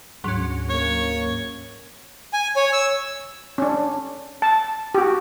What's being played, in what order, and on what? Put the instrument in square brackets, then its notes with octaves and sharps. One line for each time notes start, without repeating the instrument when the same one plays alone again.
[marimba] D2 G#2 [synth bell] F#3 C#4
[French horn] A#3 [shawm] C#5
[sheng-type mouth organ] G#5
C#5
E6
[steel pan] C#4 D4
A5
F#4 G4